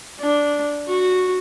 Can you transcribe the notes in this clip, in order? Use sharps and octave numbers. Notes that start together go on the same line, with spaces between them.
D4
F#4